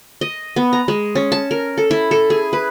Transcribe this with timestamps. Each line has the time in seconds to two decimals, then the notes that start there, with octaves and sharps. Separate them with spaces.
0.21 D#5
0.56 B3
0.73 A#5
0.88 G#3
1.15 C#4
1.32 A5
1.51 A#4
1.78 A4
1.91 E4
2.11 A4
2.30 G#4
2.53 B4